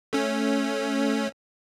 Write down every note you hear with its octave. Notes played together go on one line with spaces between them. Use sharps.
A3 C#4